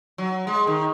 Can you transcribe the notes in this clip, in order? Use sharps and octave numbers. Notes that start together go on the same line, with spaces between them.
F#3
G#3
D#3